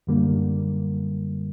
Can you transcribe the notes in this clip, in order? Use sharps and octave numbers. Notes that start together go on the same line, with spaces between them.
F#2 D3 G3 A#3